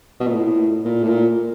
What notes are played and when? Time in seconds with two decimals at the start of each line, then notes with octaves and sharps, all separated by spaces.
0.20 B2
0.27 A#2
0.34 A2
0.85 A#2
1.03 A2
1.09 A#2